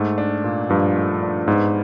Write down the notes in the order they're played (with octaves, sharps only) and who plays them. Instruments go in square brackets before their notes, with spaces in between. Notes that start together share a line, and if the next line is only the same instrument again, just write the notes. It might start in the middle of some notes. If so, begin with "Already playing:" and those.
Already playing: [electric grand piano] G#2 [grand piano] A3
[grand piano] D4
A#2
[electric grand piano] G2 [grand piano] F3
[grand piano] A3
D4
[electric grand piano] G#2 [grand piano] B3